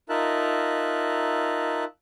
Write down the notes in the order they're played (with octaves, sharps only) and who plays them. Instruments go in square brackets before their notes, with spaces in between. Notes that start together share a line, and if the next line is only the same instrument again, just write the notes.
[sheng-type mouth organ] D#4 F4 A#4 E5 A5 F#6